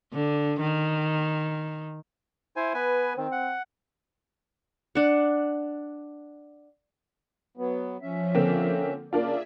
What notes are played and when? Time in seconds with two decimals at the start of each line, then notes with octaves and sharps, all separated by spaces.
0.13 D3
0.61 D#3
2.56 E4 C5 G#5
2.74 B3 B4 G#5
3.17 D#3 C4
3.32 F#5
4.95 D4 F#5
7.57 F#3 B3
8.02 F3 C#4 E5
8.35 D3 A#3 C4
9.13 C#3 A#3 D4 F4 G#4 D5 E5